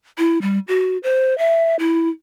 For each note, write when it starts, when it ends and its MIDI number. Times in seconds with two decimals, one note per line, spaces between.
0.18 0.39 64
0.42 0.59 55
0.68 0.98 66
1.03 1.37 72
1.38 1.76 76
1.79 2.09 64